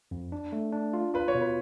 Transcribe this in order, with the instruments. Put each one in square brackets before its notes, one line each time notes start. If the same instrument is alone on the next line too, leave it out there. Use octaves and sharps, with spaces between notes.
[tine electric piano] F2
D4
A3
D4
F4
[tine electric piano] F4 [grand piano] B4
[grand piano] C#5
[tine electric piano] B2
[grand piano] B4